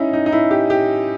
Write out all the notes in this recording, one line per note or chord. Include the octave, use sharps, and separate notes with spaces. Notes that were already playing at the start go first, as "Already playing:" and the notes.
Already playing: C#4 D#4 E4
D#4
D#4
E4
G4
G4